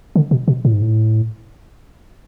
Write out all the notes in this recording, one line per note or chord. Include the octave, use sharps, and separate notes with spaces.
D3
B2
B2
A2
G#2
A2